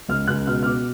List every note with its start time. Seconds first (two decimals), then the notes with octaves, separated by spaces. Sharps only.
0.09 C#2 F6
0.27 C#2 F#6
0.47 B2 F6
0.63 F6
0.66 B2 D6